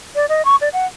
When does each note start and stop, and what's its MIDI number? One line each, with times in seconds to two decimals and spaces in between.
0.16 0.26 74
0.29 0.45 75
0.45 0.56 85
0.61 0.69 74
0.73 0.86 78